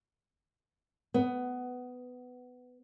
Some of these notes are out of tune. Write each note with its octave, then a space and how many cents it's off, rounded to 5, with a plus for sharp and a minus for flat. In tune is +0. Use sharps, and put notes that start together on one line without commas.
B3 +15